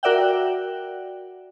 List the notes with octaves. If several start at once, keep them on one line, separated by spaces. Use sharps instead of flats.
F#4 A#4 D5 E5 F#5 G5